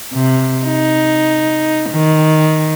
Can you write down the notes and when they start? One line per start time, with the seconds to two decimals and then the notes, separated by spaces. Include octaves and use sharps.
0.13 C3
0.65 D#4
1.90 D#3